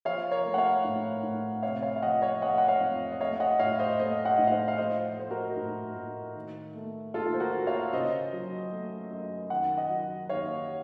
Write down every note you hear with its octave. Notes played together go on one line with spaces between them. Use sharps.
F3 C#5 F5
A#4 C#5
A3
F#5
C#5 F5
A2
A2
C3 C#5 F5
C#5 F5
F5
F3 D#5 F#5
C#5 F5
A3 D#5 F#5
F#5
C#5 F5
F2
D#5
A3 C#5 F5
D#5 F#5
A2 C#5 F5
C5 D#5
A3 C5 D#5
D#5 F#5
A2
F5
C5 D#5
F5
F3 C5 D#5
A3 C5
F#4 A#4
A2
A2
D#3
A3
D#2 F4 A4
C5
F#4 A#4
D#2
C#5 F5
C#3 C5 D#5
F#3
A3
F#2
D#3 F#5
D#5 F#5
F#3
D#2 C#5 F5